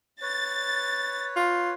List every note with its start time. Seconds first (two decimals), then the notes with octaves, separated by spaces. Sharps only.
0.22 B4 C#5 A6
1.36 F4